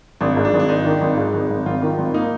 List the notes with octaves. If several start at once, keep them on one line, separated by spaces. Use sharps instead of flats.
G#1 D4
G#2
D4
G#1
D4
G#1 D#4
D#3
G#1
G#2
G#1
G#1
G#1 F4
D#3
G#1
A#3 D#4